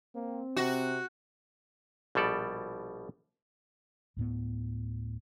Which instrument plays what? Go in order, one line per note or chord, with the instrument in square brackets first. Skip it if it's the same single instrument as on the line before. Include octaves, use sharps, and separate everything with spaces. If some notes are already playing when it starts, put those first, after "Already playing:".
[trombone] A#3 [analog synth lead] C4
[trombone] C3 [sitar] F#4
[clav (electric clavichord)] A#1 B2 G3 A4 D5
[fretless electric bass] D2 A2 B3